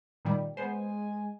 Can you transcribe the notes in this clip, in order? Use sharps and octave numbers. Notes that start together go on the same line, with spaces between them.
A#2 D#3 G3
G#3 B3 C5 G#5